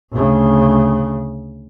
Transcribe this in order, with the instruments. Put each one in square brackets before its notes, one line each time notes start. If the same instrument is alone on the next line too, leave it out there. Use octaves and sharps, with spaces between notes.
[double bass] D2 C#3